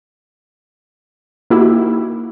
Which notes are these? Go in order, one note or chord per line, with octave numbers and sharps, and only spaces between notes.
A#3 D#4 E4 F#4 G4